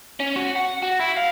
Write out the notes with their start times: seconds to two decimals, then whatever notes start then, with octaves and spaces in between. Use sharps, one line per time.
0.20 C#4
0.36 F#4
0.56 F#5
0.83 F#4
1.00 E4
1.17 F5